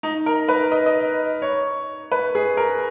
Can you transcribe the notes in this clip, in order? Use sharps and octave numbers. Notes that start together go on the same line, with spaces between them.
D#4
A#4
B4
D#5
D#5
C#5
B4
G#4
A#4